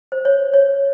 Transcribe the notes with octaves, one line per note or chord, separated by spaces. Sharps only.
C5
C#5
C#5